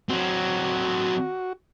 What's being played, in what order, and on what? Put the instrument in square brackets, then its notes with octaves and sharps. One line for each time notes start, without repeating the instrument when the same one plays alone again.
[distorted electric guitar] F#3 C4 [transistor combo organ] F#4